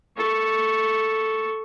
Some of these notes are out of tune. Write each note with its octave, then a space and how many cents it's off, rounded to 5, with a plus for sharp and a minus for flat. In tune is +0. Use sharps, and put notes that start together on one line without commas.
A4 +0 C#6 +0